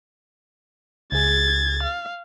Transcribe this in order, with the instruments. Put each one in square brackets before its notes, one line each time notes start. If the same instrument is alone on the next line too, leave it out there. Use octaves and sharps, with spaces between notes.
[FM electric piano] C#2 G#4 [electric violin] G#6 A6
[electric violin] F5